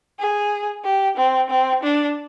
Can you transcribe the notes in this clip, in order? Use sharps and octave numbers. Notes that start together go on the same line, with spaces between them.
G#4
G4
C4
C4
D4